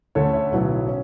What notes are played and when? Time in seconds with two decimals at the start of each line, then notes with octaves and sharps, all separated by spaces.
0.15 D2 D3 A3 C#4 A4 C#5
0.33 C#5 E5
0.52 B1 A2 F#3 B3
0.88 C#4